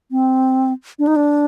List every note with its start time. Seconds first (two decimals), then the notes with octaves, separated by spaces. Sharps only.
0.11 C4
0.99 D4
1.07 D#4
1.16 D4